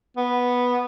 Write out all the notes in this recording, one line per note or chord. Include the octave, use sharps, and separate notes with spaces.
B3